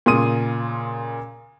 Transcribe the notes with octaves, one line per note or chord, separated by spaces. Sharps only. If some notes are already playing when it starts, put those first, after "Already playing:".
A#2 C#3 C6 D#6 D#7